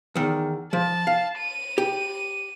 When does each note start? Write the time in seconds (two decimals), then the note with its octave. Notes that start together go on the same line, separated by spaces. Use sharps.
0.16 E2 D#3
0.73 F3 A5
1.07 F5
1.38 D#7
1.78 G4